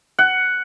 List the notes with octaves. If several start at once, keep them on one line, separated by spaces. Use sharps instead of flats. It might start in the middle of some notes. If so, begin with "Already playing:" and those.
F#5